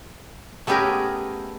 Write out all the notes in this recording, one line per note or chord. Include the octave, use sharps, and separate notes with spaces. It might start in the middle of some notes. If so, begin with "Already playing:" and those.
A3 B3 C#4 G4 G#4 A#4